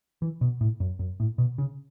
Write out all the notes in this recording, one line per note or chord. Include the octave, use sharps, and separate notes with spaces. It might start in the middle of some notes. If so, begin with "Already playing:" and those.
E3
B2
A2
F#2
F#2
A2
B2
C#3